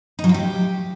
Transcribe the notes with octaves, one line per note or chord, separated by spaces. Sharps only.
D#4
F#3
F4
G4